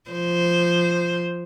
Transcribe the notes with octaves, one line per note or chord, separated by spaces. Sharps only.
F3 C5